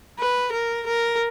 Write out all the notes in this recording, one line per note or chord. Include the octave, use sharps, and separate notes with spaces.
B4
A#4
A#4